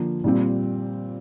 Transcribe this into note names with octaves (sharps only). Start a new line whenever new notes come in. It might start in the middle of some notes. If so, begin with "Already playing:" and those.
Already playing: D3 F3 A#3
A#2 G3 C4